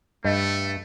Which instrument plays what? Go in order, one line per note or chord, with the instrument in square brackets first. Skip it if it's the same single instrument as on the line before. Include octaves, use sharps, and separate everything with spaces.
[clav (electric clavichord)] G2 [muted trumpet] A3 [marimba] D#5